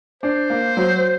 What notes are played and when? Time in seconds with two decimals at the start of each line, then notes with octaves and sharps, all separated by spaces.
0.23 D4 C5
0.50 A#3
0.77 F#3